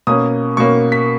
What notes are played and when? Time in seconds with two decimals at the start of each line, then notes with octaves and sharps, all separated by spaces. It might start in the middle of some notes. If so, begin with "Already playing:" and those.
0.07 B2 A#3 C#4 D#6
0.57 B2 A#3 C#4 C#6
0.92 B6